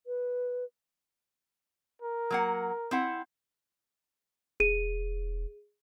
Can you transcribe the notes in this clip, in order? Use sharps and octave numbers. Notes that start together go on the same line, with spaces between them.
B4
A#4
F#3 A#3 F#5
C4 E4 F#5
E1 G#4 D#7